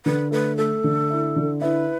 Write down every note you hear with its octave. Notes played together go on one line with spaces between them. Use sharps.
D3 B4
A3 B4
A3 A4
D3
E4
D3
E4 B4